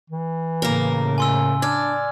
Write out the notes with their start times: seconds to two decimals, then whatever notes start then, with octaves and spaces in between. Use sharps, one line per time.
0.10 E3
0.62 A2 C#3 A#3 A#4
1.18 G#5 C6 E6
1.62 D4 D5 F6 G#6